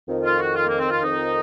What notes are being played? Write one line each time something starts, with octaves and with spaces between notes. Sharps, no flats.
F2 D#3
F4
F#4
F4
A#3
C4
F4
F2 D#3 D#4